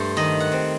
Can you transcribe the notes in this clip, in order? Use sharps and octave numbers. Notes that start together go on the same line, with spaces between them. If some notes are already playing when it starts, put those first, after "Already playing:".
Already playing: G2 A3 C5
D#3 D#5
F#5
C4